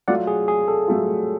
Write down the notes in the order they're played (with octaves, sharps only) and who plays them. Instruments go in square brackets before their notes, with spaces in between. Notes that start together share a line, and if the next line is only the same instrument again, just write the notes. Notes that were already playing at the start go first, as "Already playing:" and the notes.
[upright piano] F#3 A3 F4 [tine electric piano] D5 F#5
[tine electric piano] G#4
G#4
A4
[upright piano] F#3 A3 F4